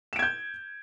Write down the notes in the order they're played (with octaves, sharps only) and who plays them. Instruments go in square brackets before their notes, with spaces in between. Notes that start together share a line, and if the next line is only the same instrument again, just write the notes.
[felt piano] E7
D7
G#6
G6